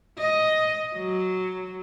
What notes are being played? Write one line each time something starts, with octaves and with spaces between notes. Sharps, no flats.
D#5
F#3